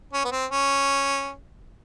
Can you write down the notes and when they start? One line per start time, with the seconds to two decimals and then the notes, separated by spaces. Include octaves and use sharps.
0.13 C#4
0.25 B3
0.32 C4
0.51 C#4